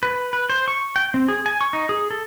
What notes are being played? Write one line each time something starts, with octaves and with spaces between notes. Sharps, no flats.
B4
B4
C5
C#6
G5
C4
G#4
G#5
C#6
D#4
G#4
A4